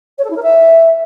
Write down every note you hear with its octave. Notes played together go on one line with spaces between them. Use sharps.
C#5
A4
E4
A#4
E5